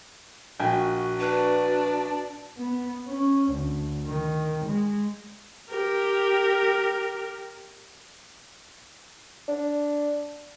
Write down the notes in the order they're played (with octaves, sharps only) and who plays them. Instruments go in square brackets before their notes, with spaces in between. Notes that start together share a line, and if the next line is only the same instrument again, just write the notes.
[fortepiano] A#1 G5 G#5 [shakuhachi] F#4
[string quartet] D4 [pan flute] B4
[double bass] B3
C#4
D2
D#3
G#3
[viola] G4 A#4
[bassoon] D4